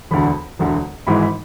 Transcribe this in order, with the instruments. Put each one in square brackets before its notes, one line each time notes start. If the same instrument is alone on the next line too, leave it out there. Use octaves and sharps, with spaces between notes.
[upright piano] E1 D2 D3 B5
E1 D2 D3
G#1 G#2 E3 G#3 B5
B5